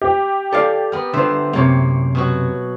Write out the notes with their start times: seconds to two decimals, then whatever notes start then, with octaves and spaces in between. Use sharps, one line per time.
0.02 G4
0.53 A4 D5 F5
0.92 B3 A#4
1.13 D3 B3 C5 E5
1.53 F#2 C3 A#3 C#5
2.15 B2 F#3 F#4